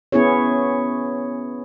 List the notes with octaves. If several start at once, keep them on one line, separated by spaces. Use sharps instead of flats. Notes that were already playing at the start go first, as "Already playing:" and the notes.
B3 C#4 E4 G#4 C#5